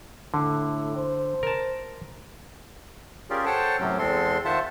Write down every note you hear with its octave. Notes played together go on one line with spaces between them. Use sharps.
A2 D3
C5
A#4 A5
C#4 F4 G4 G#4 A#4 D5
A4 C5 C#5 F#5 G5 A5
F#2 A2 C3 F#3 C#4
E2 G#3 C4 A4 C6
D#3 F4 C5 E5 F#5 A5